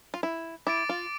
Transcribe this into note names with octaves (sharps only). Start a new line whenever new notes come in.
F4
E4
E4 D6 A6 D7
F4